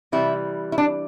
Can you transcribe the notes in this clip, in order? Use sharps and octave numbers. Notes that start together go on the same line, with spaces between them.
C3 E3 G3 E4
E4
D4